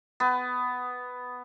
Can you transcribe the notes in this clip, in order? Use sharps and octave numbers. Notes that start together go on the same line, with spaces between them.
B3